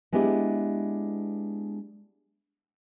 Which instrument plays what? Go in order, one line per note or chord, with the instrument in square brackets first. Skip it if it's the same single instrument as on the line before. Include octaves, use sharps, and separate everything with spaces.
[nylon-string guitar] G#3 B3 D4 E4 G4